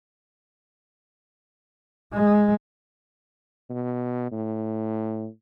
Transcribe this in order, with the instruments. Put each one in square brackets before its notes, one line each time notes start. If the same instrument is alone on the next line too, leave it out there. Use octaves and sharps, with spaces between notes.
[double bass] G#3
[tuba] B2
A2